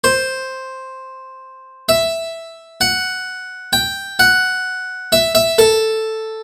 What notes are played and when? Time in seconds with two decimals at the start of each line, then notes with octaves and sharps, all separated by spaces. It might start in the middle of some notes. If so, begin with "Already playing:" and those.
0.04 C5
1.89 E5
2.81 F#5
3.73 G5
4.19 F#5
5.12 E5
5.35 E5
5.58 A4